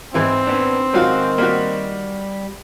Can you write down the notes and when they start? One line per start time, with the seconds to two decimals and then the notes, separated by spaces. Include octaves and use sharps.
0.14 G#2 E3 C4 E4
0.47 D#3 B3 D4
0.94 G#2 D#3 F#3 F4 F#4
1.38 G3 A#3 F#4